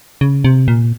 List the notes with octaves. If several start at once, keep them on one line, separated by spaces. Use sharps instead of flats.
C#3
C3
A#2